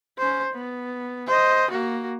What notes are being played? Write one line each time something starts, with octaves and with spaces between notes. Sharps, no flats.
C#4 C5
B3
C5 D#5
A#3 F#4